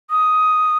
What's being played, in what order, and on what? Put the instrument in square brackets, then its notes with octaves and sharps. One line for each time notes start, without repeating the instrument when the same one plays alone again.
[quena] D#6